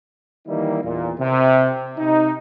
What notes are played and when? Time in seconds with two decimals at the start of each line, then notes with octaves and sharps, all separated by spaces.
0.47 D#3 E3 G3 A#3 D#4 E4
0.84 E2 A#2
1.19 C3
1.98 C3 D#4